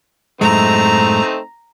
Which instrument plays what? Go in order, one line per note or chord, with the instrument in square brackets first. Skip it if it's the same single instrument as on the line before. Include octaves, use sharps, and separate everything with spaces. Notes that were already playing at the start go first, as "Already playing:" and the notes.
[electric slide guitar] F#2 A2 G#3 [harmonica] A3 C4 D#4 [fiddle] A#5